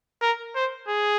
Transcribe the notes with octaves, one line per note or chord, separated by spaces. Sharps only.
A#4
C5
G#4